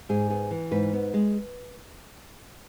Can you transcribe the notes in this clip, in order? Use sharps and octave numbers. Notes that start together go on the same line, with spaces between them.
G#2 G#4
B3 G#4
E3
G#2 B4
B3
G#3